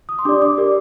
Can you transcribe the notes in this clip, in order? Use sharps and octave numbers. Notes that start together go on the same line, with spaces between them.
D#6
C6
D4 G4 D5 D6
D6
G4 A#4 D5